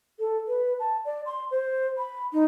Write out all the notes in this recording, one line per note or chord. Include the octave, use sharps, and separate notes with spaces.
A4
B4
A5
D5
C6
C5
B5
D#4